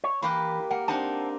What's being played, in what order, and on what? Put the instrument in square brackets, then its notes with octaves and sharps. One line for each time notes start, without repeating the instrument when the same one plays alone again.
[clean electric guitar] C#5
[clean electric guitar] E3 [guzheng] A#3 G4 B4
[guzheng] A#3 [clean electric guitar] F#5
[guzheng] C4 D4 D#4 [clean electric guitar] C5 F#5 A5